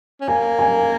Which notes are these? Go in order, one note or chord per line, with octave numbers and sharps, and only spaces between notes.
C#4
A#3 G#5
G#5